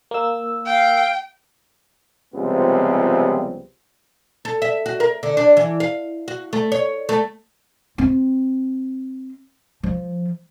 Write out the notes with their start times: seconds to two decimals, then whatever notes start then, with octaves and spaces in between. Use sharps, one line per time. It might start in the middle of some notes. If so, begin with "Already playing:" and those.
0.11 A#3 E6
0.66 F5 G5
2.34 C#2 C3 F3 G3 B3 C4
4.45 A4
4.62 E5
4.86 F#4
5.00 A#4
5.23 D3
5.37 D4
5.57 E3
5.80 F5
6.28 F#4
6.53 A3
6.72 C#5
7.09 A3
7.98 C4
9.83 F3